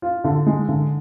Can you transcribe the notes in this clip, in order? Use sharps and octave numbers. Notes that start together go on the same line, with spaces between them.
F4
D3
G#3
D3